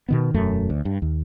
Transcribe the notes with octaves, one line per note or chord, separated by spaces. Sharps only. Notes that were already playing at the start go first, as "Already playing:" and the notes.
B2 D#3 B3
E1 F#2 A3
D2
G2
D#2